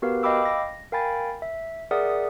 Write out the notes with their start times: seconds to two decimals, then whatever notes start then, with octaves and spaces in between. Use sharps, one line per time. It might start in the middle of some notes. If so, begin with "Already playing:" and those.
0.02 B3 F#4 G4 A#4 B4 F5
0.23 D#5 F5 G5 B5 D6 E6
0.45 A#6
0.92 A#4 F5 G5 G#5 B5 A6
1.42 E5
1.91 G#4 A#4 D5 E5 F#5 D#6